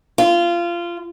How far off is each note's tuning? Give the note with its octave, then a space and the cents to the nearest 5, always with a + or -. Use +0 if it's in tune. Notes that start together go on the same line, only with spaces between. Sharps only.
F4 -20